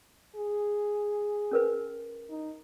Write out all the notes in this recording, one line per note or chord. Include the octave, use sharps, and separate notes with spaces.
G#4
C#4 A#4 B4
D#4